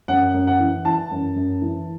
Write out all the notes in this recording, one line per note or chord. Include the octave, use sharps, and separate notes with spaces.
F#2 F#5
F#2
F#5
E3
E3 A5
F#2
F#2
E3